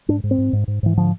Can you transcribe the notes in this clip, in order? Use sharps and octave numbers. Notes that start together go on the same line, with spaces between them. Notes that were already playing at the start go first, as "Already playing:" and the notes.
G#2 D4
G#2
C4
G#2
G#2
G#2
G#2 E3
D3 F3